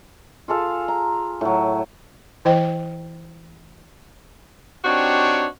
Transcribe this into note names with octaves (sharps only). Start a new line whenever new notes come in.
F4 G#4 A4 F5
A#5
A2 F#3
E3 E4 C5 D#5 G5
C4 D4 D#4 F#4 G4 C#5